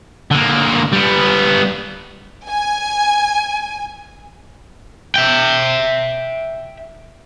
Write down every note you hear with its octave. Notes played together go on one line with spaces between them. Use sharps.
D3 A#3
G3 B3
G#5
E5 G5